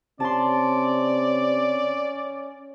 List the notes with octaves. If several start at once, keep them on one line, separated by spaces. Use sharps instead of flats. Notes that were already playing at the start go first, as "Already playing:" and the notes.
C3 C#4 D5 A5 C6